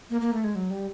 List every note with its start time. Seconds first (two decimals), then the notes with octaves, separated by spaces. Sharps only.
0.10 A#3
0.21 A#3
0.33 A3
0.44 G#3
0.55 F#3
0.70 G3